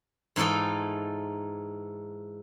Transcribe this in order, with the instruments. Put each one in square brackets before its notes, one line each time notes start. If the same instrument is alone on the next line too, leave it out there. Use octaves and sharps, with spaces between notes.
[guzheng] G#2 E3 D#4 F4 A4